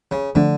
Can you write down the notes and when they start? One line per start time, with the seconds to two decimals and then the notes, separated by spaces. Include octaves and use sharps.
0.11 C#3
0.35 D3 F3 A3 D4